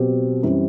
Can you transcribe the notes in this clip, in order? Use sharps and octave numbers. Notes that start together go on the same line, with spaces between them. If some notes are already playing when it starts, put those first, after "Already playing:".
Already playing: B2 F#3 C4 G4
F#2 E3 G3 C4